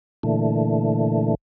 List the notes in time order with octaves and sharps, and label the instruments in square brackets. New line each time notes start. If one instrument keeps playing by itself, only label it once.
[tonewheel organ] A#2 D3 E3 A3